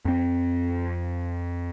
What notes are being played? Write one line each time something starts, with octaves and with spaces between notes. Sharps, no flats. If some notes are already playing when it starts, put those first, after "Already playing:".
F2 C4